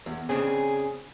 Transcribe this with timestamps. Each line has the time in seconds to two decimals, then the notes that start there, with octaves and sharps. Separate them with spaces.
0.06 E2
0.29 C#3 C4 D4 G#4